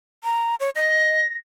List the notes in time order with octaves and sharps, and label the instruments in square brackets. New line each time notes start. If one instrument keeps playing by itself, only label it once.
[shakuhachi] A#5
C#5
[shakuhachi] D#5 [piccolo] A#6